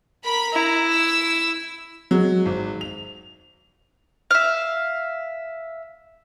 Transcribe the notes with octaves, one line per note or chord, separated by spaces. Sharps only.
A#4 B5
E4 A#5
E6
F#3 G#3
G#1
F7
E5 F5